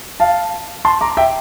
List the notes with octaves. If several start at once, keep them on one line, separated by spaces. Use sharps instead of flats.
F5 A5
A5 C6
A#5 D6
E5 G5